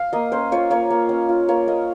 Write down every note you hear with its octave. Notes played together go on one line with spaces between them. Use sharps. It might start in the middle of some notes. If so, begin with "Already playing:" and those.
Already playing: F5
A#3 D#5
C#4 C5
F4 C#5
A#3 C#5
A#3
C#4
F4
A#3 C#5
A#3 D#5